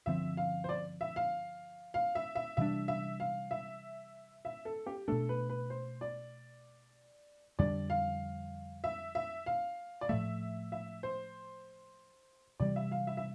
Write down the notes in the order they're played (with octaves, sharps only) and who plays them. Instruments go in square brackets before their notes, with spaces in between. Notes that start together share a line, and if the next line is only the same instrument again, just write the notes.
[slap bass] G2 D3 F3 C4 [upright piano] E5
[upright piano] F5
C5
D5
E5
F5
F5
E5
E5
[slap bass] C3 E3 G3 D4 [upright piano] E5
[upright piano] E5
F5
E5
E5
A4
G4
[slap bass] B2 A3 D4 [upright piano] A4
[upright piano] B4
B4
C5
D5
[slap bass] F2 D3 G3 D4 [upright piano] D5
[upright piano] F5
E5
E5
F5
D5
[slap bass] A2 F3 A3 [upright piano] E5
[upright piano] E5
C5
[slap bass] C3 E3 G3 [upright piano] D5
[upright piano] E5
F5
E5
E5